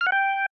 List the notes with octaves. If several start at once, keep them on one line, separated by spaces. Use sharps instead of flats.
F6
F#5
G5